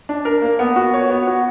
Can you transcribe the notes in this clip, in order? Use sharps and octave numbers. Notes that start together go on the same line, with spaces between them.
D4
A#4
A#3
B3
F#4
C#5
B3
F#4